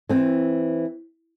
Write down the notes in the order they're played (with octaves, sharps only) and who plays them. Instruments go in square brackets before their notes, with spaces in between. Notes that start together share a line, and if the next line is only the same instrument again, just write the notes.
[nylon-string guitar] E3 C4